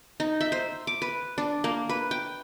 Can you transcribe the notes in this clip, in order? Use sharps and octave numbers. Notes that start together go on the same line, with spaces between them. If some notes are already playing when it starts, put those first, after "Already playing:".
D#4
E5
C5
D6
B4
D4
A#3
B4
G5